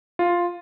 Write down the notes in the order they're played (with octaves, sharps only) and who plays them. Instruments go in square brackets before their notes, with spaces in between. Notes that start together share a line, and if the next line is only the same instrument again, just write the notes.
[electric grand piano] F4